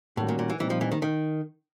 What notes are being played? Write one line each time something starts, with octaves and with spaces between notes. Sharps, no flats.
A2 D#3 G3 A#3 C#4 F#4
A#2
A#2
E3
A#2 E3 G3 C4 D#4
F3
E3
D#3
D#3